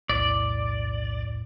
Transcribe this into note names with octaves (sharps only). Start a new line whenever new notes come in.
B1 E2 A2 D5